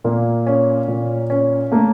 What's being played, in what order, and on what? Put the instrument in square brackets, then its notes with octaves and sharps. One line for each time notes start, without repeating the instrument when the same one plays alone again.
[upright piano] A#2 [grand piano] A#3
[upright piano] C#4
A#2
C#4
[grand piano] A3 [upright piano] A#3